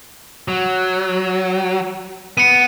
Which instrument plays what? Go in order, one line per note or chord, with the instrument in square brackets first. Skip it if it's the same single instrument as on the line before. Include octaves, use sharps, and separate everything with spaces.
[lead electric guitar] F#3
[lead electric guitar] B3 [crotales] C#7 D#7